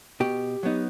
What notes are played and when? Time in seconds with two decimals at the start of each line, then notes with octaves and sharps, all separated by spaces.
0.20 B2 G4
0.63 F#3 B3 D#4